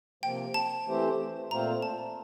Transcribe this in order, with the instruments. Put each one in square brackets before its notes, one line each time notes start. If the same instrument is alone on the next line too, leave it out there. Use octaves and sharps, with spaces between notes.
[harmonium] C3 F3 A#3 [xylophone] G5
[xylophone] A5
[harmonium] E3 A3 C4 G4 C5
[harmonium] A#2 A3 C4 F4 C5 [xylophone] A#5
[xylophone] A5